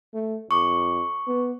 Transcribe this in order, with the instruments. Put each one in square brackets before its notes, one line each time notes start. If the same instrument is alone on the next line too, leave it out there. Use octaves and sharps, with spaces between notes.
[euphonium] A3
[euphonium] F2 [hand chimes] C#6 D6
[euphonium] B3